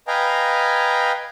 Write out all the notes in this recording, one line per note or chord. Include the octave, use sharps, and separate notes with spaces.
B4 D#5 F5 G5 G#5 A#5